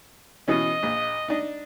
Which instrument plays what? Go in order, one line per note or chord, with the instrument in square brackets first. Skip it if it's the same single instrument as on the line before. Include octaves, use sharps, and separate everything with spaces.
[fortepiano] B2 E3 C#4 [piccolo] D#5
[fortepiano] A#1
D4 D#4